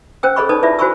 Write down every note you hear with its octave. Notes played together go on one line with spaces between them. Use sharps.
C#4 C5 G5 E6
G#4 A4 C#5 D#5 B5 C#6
D#4 B4 D5 A5 D#6
E4 F4 B4 D5 E5
F#4 C5 G#5 B5 C#6 E6